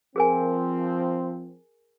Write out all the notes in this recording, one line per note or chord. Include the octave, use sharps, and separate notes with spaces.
F3 C4 G#4 A#4 G#5